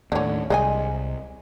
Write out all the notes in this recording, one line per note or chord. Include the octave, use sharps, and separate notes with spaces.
D#2 A2 D3 C#4
C2 G#3 D#5 G#5